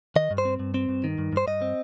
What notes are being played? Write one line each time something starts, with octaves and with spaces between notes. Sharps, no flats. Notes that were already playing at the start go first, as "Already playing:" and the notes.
D#3 D#5
G2
C5
C4
G2
C4
G2
D#3
G2
G2 C5
G2 D#5
C4